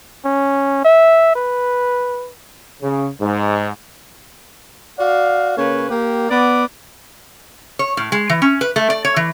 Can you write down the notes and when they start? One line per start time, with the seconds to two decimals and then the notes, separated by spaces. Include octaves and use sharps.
0.25 C#4
0.84 E5
1.36 B4
2.82 C#3
3.21 G#2
4.99 F#4 D5 F5
5.57 C#3 A#3 B4 C#5
5.90 A#3 G4
6.30 B3 D5
7.79 C#5
7.97 A2
8.12 G#3
8.30 E3
8.42 C#4
8.61 B4
8.76 A3
8.90 D5
9.05 C#5
9.16 E3